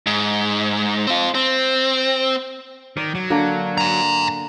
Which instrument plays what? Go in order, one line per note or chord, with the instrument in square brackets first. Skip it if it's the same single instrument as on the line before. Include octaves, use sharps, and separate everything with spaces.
[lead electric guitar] G#2
C4 F4
C4
[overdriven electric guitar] D#3 [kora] D5
[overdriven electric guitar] F#3
[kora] D3 A#3 A#4
[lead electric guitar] G#5 A#5